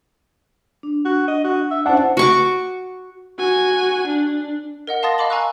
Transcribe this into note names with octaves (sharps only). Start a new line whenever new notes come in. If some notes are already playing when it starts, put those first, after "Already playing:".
D4
F#4
D#5
F#4
E5
C#4 D4 E4 C5 F#5 A5
F#4 C#6 D6
F#4 G#5
D4
A#4 D#5 F#5
F5 A5 C6 D#6 A6 A#6
D#5 F5 B5 D6 F#7 G7
F5 G#5 A#5 C#6 E6 F#6